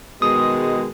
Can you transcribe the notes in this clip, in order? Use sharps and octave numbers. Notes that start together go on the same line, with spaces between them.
B2 D#3 G#3 D#6